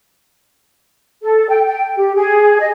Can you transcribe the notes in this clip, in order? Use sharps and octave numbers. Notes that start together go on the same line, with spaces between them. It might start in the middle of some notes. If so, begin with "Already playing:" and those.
A4
G5
G5
G4
G#4
D#5